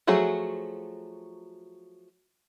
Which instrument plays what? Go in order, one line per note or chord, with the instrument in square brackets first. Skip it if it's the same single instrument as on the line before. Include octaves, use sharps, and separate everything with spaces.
[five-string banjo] F3 F#3 A3 F#4 G#4